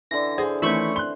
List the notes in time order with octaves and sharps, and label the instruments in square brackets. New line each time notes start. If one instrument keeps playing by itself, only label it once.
[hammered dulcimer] D3 E3 [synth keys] A#6
[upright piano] G#4 C5
[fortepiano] D#3 A3 C#4 [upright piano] E3 [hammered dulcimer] C5 [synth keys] E5 B5 C#6
[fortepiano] C6 F#6 [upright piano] G7